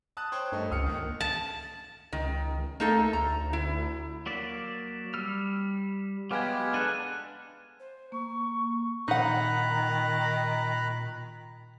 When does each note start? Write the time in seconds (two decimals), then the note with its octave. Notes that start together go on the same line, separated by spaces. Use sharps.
0.17 A5 D#6 F#6
0.32 C5 C#5 G5
0.52 G2 A3 D#4
0.71 C#2 D#6 F6 C#7
0.86 D#3 A#3
1.20 A5
2.13 C#2 D#3
2.80 A3 A#3 D#4 A4
3.13 D2 A#5
3.53 E4
4.26 F#3 A#3 D5 B6 E7
5.14 G3 E6 F6
6.31 F#3 G#3 B3 G4 F5 D6 G#6
6.74 D4 A4 F#6 D#7
7.79 C5
8.12 A#3 C#6
9.08 A#2 D#3 D#4 F#5 A#5 B5 F#6